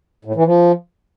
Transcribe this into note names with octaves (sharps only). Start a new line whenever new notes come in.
A2
E3
F3